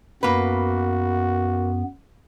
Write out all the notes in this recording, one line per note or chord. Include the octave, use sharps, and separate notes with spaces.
F#2 A#3 B3 F#4 B4